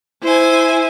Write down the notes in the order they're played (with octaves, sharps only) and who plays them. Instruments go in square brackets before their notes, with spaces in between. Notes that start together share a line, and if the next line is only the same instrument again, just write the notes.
[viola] E4 [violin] C5 G#5